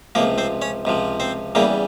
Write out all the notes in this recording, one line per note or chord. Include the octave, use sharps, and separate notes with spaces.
C#2 C3 F3 A#3 A#4
C4 C5
C#4 C#5
C#2 C3 F3
C4 C5
E2 C#3 E3 G3 A#3 A#4